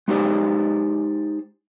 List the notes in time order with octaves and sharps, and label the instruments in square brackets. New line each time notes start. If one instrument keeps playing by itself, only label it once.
[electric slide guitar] G#3 D#4 G4 C5 D5